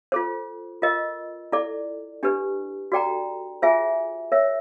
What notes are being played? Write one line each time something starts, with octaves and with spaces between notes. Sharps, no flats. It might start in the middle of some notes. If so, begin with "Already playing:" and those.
F4 A4 C5
F4 A#4 D#5
E4 A4 D5
D4 G4 B4
F#4 A4 D5 G5 A#5
F4 G#4 C5 E5 G#5
A#4 C#5 E5